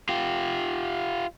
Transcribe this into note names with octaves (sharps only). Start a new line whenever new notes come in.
F4 G4